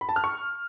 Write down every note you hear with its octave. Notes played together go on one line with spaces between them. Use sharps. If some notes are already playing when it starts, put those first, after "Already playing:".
B5
A5
F6
C#6